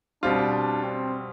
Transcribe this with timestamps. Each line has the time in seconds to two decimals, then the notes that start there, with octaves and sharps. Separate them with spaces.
0.23 B2 G3 C4 D4 F4
0.83 C4